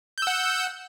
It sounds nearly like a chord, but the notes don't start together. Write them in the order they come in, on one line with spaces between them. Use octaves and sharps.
G6 E6 F#5